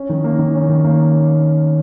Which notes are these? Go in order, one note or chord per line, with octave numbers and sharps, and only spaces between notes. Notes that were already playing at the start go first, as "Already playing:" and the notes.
Already playing: C#4
D#3
A#3
D#3
C#4
D#3
A#3